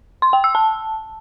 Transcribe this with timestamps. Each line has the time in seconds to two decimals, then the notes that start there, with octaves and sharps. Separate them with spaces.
0.22 C6
0.33 G5
0.44 E6
0.55 A5